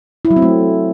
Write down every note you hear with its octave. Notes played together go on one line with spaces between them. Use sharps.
E4
F#3
C4
A3